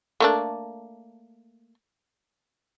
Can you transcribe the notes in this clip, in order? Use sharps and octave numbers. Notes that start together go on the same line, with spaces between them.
A3 A#3 D4